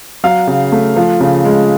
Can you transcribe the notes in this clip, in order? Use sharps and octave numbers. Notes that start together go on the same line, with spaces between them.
F#3 F5
C#3
A3
F3
C#3
G#3